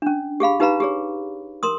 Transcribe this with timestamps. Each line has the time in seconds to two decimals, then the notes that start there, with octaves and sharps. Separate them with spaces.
0.02 C#4 D4
0.40 G4 G#4 F5 B5
0.60 D#4 G4 B4 F5 A#5 B5
0.80 G4 G#4 C#5
1.63 A#4 C6 D#6